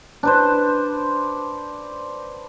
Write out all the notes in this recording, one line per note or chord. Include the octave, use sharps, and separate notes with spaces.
D4 B4 C5